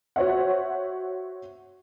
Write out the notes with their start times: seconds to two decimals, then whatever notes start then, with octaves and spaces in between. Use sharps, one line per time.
0.16 F#4 C5 C#5 E5 F#5